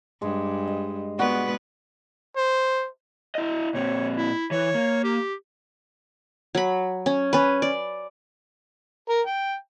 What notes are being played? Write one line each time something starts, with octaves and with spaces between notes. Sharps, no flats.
G2 G#3
D#5
G#3 B3 F#4 B4 D5
C5
E4 D#5
A#2 C4 C#5
E4
E3 C#5
A#3
G4
F#3 B5
C#4
C#4 B4
D5
A#4
G5